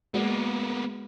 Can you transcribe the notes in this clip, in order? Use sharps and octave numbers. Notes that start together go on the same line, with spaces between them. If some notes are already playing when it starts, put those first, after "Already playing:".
G#3 A#3 B3 F#4 D5